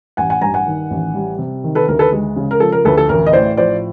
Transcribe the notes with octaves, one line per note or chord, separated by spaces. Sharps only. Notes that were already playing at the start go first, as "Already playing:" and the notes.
A1 F#5 G#5
F#5 G#5
G2 G#5 A#5
F#5 G#5
D#3
A1
G3
C3
D#3
A4 B4
D2 A#4
A4 B4
G#3
C#3
A#4
F3 A4
A#4
D2 A4 B4
A4
A1 A#4
D#5
A2 C5 D5
F3 C5 D5